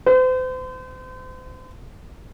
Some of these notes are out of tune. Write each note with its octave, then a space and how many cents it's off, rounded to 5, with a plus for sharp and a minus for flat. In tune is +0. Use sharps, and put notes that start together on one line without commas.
C5 -40